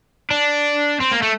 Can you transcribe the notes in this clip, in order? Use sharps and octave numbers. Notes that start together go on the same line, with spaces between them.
D4
C4
A#3
A3